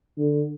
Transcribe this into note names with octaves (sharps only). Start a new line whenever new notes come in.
D3